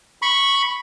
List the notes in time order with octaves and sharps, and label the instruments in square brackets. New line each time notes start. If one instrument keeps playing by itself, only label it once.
[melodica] B5 C#6